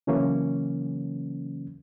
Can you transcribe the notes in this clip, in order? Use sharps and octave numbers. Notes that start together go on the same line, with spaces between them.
C#3 E3 F#3 A#3 C#4